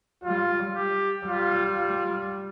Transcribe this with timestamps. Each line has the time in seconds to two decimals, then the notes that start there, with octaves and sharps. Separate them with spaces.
0.24 G3 F4
0.75 G4
1.26 G3 F4
1.77 F4